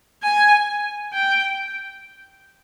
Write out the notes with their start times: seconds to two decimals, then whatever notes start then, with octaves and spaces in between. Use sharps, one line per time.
0.23 G#5
1.13 G5